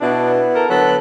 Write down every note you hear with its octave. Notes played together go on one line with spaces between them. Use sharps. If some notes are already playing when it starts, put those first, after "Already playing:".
B2 B3 D4 E4
A4 A#4
D3 F#3 B3 A4 B5 F#6